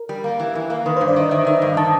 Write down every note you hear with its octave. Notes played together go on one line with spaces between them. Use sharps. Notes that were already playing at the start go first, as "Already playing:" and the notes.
Already playing: A#4
G3
A#3
E3
E3
A#3
D#3 B4
G2 C5
D5
D#3 D#5
D#3 E5
D#3 E5
G2
D#3 A5